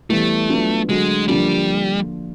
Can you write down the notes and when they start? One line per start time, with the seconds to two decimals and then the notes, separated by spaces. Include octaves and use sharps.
0.10 E3 G3 A3 B3 E4
0.49 F#3 B3 D4 F4
0.89 D3 F#3 G#3 A3
1.28 D3 F3 G3 A#3 D4 F4